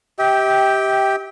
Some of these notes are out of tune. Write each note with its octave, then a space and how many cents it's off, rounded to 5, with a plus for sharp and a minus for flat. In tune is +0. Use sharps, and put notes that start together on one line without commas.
G4 -5 E5 -45 G5 +0